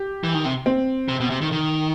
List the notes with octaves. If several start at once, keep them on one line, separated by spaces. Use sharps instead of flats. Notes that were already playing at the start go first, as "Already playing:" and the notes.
Already playing: G4
E3
D#3
C3
C4
C3
B2
C3
D#3
D#3